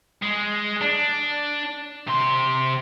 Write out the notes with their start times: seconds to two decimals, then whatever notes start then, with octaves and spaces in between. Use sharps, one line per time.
0.22 G#3
0.81 D4
2.07 C3 C6